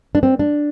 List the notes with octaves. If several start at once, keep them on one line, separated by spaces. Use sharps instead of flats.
D4
C4
D4